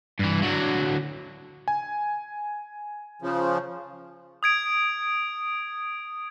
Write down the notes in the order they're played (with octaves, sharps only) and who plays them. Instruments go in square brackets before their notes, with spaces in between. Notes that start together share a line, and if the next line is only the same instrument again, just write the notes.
[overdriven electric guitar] G2 E3
D3 F#3
[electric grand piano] G#5
[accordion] C#3 F3
[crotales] D#6 G#6 D7